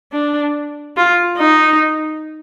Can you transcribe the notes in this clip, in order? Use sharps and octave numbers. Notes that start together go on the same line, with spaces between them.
D4
F4
D#4